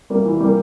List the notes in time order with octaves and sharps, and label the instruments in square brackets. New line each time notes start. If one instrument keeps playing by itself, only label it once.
[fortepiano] G3 A#3
E3
G3 A#3